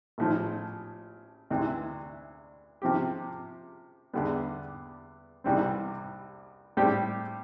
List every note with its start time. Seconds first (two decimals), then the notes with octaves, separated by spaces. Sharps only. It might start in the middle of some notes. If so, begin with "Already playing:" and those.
0.18 A1 A2 F3
1.50 D2 C3 E3
2.82 C3 F3 C4 G4
4.13 E2 D3 G3 B3
5.44 C2 C3 E3 G3 C4
6.77 A2 G3 C4 G4